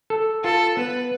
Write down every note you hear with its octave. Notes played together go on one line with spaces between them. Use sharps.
A4
F4 A4
B3 B4